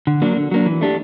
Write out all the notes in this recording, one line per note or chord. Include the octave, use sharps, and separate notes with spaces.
D3
F#3 A#3 D4
D3
F#3 A#3 D4
E3
A3 D4 G4